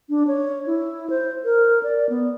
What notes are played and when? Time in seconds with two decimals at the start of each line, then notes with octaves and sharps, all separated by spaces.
0.09 D4
0.27 C#5
0.66 E4
1.10 C5
1.44 A#4
1.83 D5
2.10 B3